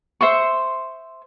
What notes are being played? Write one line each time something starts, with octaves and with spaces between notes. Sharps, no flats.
C5 E5 C6 C#6